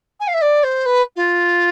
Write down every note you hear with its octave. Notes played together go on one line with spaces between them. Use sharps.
G#5
F5
E5
D5
C5
B4
F4